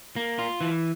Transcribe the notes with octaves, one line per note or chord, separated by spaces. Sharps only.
A#3
F4
E3